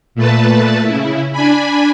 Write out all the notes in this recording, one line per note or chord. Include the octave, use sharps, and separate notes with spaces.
A#2 A3 B4 A5
C#3 E4
D4 G#5 B5